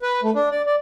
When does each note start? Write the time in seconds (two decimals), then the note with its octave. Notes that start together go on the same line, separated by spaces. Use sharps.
0.02 B4
0.23 A3
0.35 D4
0.51 D5
0.66 D5